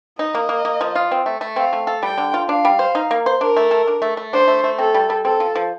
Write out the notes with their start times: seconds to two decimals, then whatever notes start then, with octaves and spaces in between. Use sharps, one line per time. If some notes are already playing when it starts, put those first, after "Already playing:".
0.19 D#4 D#5
0.35 A#3
0.49 A#3
0.65 A#3
0.81 F3
0.95 F4
1.11 C4
1.26 A3
1.41 A3
1.56 C4 F5
1.73 A3
1.87 A4
2.03 G3 G5
2.18 D3
2.34 F4
2.49 D4 F5
2.65 G3
2.79 C5
2.95 D#4
3.11 A#3
3.26 C5
3.41 D4 A#4
3.56 A3
3.71 A4
3.87 D4
4.02 A3
4.17 A3
4.33 D4 C5
4.48 A3
4.64 A3
4.78 C4 A4
4.94 G3
5.10 G3
5.25 C4 A4
5.40 F3
5.56 F3